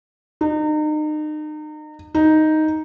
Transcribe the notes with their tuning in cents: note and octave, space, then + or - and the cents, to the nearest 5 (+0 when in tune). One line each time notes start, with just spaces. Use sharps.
D#4 -35
D#4 +0